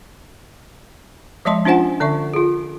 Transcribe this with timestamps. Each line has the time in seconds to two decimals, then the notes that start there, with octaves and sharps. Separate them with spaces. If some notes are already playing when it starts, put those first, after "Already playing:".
1.45 F3 G#3 D5 D#5 A5 C6
1.65 C#4 D4 F4 C5 F#5 G#5
2.00 D3 D5 E5 C#6
2.34 F4 G#4